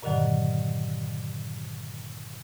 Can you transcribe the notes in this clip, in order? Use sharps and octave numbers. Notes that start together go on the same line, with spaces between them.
G2 A#2 D3 D#3 F#3